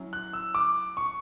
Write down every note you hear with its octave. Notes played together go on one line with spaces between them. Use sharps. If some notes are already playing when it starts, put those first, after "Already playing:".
Already playing: F#3 C#4 E4
F#6
E6
D6
C#6